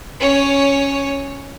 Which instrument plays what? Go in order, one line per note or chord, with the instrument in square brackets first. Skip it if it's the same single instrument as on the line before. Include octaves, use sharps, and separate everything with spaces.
[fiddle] C#4 C#5